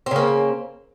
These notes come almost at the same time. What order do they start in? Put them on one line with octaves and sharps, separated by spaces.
C4 C#3 A#3